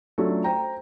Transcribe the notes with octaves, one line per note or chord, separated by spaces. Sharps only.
F#3 A3 C#4 D4 F4 A4
C5 G5 A#5